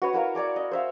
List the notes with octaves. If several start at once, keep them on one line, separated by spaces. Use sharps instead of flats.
F#4 B4 C#5
E4 F#4 A#4 F5
C#5 D5 G#5 D6
D#5
C5 E5 F5